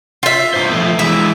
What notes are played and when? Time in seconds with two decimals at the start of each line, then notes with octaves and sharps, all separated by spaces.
0.23 F4 E5
0.54 G2 C5
0.70 F3 A3 B3
0.99 E3 G#3 E5